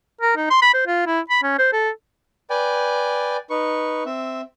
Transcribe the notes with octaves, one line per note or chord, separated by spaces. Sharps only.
A#4
D#4
C6
B5
C5
F4
E4
B5
C#4
C5
A4
B4 D5 G5 G#5
D#4 B4 C#6
C4 E5